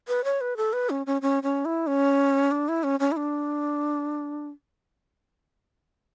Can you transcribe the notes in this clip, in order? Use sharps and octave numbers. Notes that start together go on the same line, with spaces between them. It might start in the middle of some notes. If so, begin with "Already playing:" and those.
B4
C#5
B4
A4
B4
C#4
C#4
C#4
C#4
E4
C#4
D4
E4
C#4
C#4
E4
D4